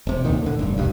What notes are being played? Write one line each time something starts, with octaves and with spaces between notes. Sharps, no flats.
E1 C3
E1 D2 A#2 D#3
A2 D3
F1 G2
D#1 B1 G2